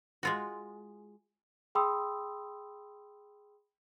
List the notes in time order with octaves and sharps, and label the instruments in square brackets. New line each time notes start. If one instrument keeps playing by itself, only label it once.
[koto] G#3 F4 F#4
[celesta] G#4 G5 B5 C6 D#6 E6